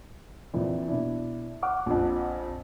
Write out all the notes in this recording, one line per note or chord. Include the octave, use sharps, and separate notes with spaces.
A#1 F2 E3
B2 D4 E4
F#5 D6 F6
A#1 F2